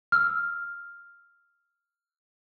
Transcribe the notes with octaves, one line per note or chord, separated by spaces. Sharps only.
E6 F6